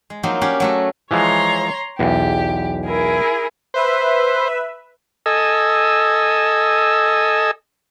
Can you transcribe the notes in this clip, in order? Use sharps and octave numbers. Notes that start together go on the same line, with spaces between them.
G#3
F3 F#3 A#3 C4 D#4
C#4 G4 D5 F5 F#5
F#3 A3 F#4
E3 F3 G#3 C#5 A#5 C6
B1 E2 G4
E4 G#4 A#4
B4 C5 E5
A4 D#5 G#5 E6